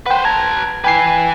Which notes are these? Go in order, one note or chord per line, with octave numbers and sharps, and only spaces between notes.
B4 C5 F#5 G5
B4 A5 A#5 G#6
E4 B4 G5 G#5 C7